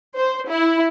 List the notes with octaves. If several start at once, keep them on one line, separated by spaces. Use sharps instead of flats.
C5
E4